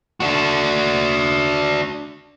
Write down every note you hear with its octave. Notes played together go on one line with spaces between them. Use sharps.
D4 F#4